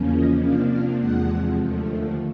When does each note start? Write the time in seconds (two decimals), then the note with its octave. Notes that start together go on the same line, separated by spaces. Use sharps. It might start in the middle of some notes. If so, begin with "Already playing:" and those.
Already playing: E2 C#3 F3 A#3 C#4
0.12 D#5
0.41 C3 F3 A#3 D4 F5
0.70 F5
0.98 E2 C3 F3 G#3 F#5
1.56 D#2 D3 F3 A3